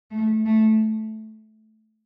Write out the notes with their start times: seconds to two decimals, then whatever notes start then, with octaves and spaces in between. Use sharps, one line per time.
0.11 A3
0.45 A3